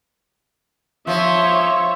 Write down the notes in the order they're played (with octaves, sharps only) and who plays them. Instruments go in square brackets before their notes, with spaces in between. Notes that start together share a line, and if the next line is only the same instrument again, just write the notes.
[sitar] F3 [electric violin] C#5 E5